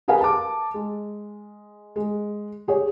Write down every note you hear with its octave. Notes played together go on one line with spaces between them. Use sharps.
G4 G#4 A#4 B4 F5 G#5
A5 D6
G#3
G#3
G4 G#4 C#5